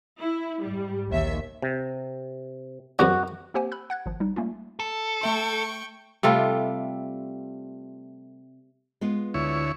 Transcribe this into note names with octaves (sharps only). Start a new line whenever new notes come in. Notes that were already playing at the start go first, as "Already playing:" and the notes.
E4
G#2 G3
A#1 D#2 E5
C3
F#2 C3 D4 F#4
A#3 C4 G4 C5 F#5 G#5
B5 E6 F#6
F#5 F#6 G#6
G#1 F3
G3 D#4
G3 A3 A#3 C#4 F4
A4
A3 E5 G5 C6 C#6
C3 G3 A3 F4
G#3 B3 F4
D2 E4 C#5